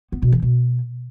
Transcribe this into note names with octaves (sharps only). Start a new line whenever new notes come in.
B3
B2
E3
B2